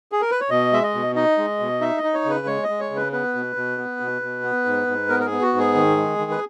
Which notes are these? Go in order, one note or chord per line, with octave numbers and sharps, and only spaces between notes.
G#4
A#4
B4
C#5
B2 D#5
G#3 E5
D#5
B2
D#4 D#5
G#3
B2
D#4 E5
D#5
D#4
C#5
C#3
B4
G#3 C#5
D#5
G#3
C#5
C#3
B4
B3 B4
B2
B2
B3
B2
B2
B3
G#2
G#2
B3 A#4
A#4
G#4
B3
F#4
G#2
G#4
D#3
G#3
D#3
B4